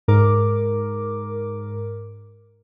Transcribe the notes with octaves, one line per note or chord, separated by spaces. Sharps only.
G#2 A#4 D6